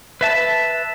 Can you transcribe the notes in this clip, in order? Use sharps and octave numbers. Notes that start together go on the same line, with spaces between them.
B4 E5 A5